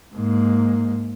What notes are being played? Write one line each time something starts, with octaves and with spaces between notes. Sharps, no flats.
G#2 A#3